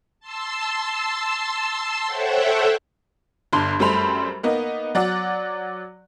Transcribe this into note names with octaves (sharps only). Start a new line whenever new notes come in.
A5 C6 E6
A4 C5 C#5 E5 F#5 G5
G1 G2 D4 C6
F#2 G3 A3 C5 B5 F7
A#3 B3 D#4
F#3 D5 F#5